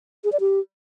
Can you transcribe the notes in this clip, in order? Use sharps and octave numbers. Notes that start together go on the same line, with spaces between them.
G#4
D5
G4